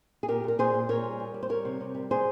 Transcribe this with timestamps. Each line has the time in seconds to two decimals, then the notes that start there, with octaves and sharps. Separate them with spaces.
0.23 G#4
0.28 A#2 G4 A#4
0.44 A#2 A#4
0.58 A#2 G#4 C5
0.74 A#2
0.89 A#2 A#4 C#5
1.04 G3
1.20 G3
1.34 G3
1.43 C5
1.49 G3 A#4 C#5
1.65 C3
1.81 C3
1.95 G3
2.10 G3 G#4 C5